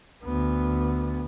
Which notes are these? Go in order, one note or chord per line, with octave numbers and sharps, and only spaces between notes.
D2 B3